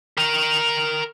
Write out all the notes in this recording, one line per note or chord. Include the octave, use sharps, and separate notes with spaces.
A#4 G5